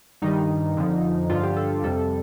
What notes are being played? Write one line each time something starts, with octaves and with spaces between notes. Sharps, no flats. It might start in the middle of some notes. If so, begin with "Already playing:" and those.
G2 D#3 G3 D#4
F2 D3 F3
G2 D3 F3 F4
G4
A4
F2 C3 G3 A4